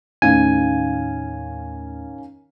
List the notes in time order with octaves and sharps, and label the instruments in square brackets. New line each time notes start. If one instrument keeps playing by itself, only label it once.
[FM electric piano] D#2 A2 [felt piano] D#3 C#4 F5 [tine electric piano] G#5